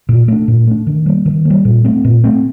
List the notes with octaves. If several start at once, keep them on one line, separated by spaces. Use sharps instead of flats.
A#2
A3 D4
A#2
A3 D4
D#3
G3 A#3
D#3
A#3
G3
A#2
A3 C4
A#2
A3 C4